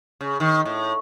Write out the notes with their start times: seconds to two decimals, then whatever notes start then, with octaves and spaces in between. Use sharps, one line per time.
0.21 C#3
0.40 D#3
0.65 A2